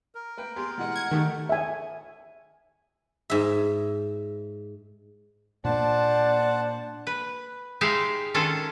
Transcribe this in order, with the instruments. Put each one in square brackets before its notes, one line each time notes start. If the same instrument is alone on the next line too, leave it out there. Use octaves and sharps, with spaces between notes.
[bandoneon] A#4
[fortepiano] A#3 B4 G5
[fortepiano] B3 G4 G#4 [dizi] C6
[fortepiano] B2 E3 G#3 [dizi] F#5
[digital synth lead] G#6
[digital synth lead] D#3 [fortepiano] A3 G4 A4
[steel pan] E5 G#5
[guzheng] G#2 E5
[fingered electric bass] A#2 A#3 [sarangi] D4 [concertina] C5 F#5 A5
[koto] B4
G#3 D#4 G4 E5 F5
D#3 C#4 D4 F4 A4